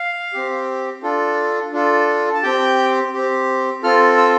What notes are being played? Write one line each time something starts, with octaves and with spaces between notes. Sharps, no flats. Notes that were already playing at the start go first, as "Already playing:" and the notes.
Already playing: F5
C4 G4
D4 F4 A4
D4 F4 A4
A5
C4 G4 G5
C4 G4
C4 F4 A4 F6
E6